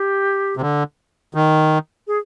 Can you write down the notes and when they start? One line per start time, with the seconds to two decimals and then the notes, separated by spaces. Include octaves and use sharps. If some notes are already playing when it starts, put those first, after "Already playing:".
Already playing: G4
0.57 C3
0.61 D3
1.34 D#3
2.07 G#4